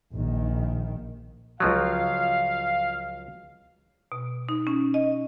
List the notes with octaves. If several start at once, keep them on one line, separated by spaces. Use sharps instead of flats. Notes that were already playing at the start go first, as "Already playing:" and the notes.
A#1 D#3
C#2 F3 F#3 F5
B2
D#4
C#4
D#5